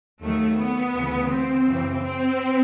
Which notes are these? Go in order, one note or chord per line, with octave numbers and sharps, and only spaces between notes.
D#2 D#3 F#3 A3
B3
D2 C#3 E3
C4
F#2 C#3 E3
C4